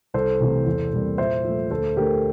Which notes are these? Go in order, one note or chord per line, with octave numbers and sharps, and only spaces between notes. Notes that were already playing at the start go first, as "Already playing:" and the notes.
C2 A4 C5
C3 E3 A3
E2
C3 G3 A#3
A#2 C5 E5
F3 A3
D2 A4 C5
D3 A3 G4 A#4